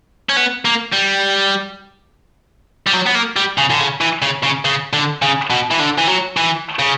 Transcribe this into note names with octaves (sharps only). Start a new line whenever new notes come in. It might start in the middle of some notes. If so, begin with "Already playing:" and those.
C#4
B3
A#3
G3
G3
F#3
B3
A#3
G3
C#3
D3
C#3
E3
C#3
C#3
C#3
D3
C#3
B2
E3
D3
E3
F#3
E3
C#3